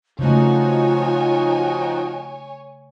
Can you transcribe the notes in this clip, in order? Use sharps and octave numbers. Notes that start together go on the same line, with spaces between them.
C#3 F3 A3 D#4 F4 F#4 C#5 G#5